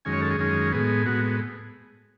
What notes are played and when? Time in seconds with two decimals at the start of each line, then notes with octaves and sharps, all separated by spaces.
0.05 F#2 D#3 G#3 C#4 G#5
0.13 C#5
0.22 A4
0.31 G#4
0.39 F#2 D#3 G#3 C#4
0.72 A2 G#3 B3 G#4
1.06 A2 G#3 B3 F#4